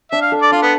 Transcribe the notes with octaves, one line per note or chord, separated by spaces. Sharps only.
D4 E5
F5
A4
D5
D4 F4
B3